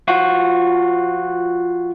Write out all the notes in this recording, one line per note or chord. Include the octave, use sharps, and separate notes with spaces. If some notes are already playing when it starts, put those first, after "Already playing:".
F3 F4 F#4